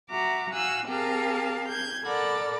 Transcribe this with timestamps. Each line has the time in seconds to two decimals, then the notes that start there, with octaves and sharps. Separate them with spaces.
0.10 F#4 E5 A#5 D6
0.52 F#4 F5 G#5 E6 F#6
0.87 C4 G4 G#4 A#4 F5 A5
1.68 G6 G#6
2.04 A4 A#4 D5 F#5 B5 A6